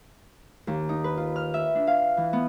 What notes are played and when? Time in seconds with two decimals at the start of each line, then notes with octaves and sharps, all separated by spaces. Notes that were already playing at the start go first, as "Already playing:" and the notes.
0.67 D#2
0.89 D#4
1.04 B4
1.17 F4
1.36 F6
1.54 E5
1.75 D4
1.87 F5
2.17 E3
2.33 B3